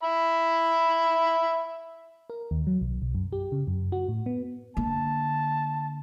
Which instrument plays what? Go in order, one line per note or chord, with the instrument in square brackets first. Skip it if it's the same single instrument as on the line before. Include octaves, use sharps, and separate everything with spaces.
[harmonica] E5 B5
[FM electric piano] A#4
D#2
F#3
B1
B1
F#2
G4
C#3
F#2
F#4
A2
B3
[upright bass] D3 A#3 [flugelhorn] A5